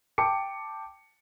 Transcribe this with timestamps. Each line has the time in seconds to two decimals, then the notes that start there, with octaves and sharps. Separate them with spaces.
0.18 G5 A5 D6 C#7